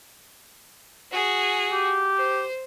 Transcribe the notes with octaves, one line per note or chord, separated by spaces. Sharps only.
F#4 G#4
G4
C5